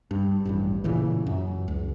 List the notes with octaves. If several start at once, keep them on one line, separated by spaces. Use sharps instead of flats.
G2
D#1 A1 G2
A#2 C#3 E3
F#2
C#2